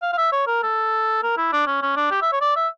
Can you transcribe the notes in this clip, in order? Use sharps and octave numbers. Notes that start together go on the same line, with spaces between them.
F5
F5
E5
C#5
A#4
A4
A#4
E4
D4
C#4
C#4
D4
G4
E5
C#5
D5
E5